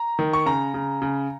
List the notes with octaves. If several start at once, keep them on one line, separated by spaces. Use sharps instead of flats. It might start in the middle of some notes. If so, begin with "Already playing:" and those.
Already playing: A#5
D#3
C#6
C#3 A#5
C#3
C#3